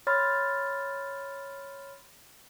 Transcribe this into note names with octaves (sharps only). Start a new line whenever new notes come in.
C#5 B5 C6 F6 A6